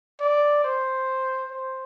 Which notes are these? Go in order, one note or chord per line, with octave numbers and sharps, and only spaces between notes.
D5
C5
C5